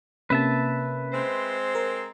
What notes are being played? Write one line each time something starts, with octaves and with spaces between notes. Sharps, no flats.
C3 A#3 C#4 B4 E5 A5
G#3 C4 C5
A#4